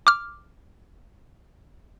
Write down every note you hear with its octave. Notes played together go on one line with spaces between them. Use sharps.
D6 F6